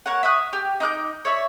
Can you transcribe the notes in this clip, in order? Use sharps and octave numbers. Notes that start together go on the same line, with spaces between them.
A#3 C#5 F#5
E5 C#6 D#6 F#6
G4
D#4 D6 F#6 G6
C#5 D5 E5